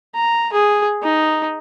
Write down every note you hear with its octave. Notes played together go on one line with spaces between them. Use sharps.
A#5
G#4
D#4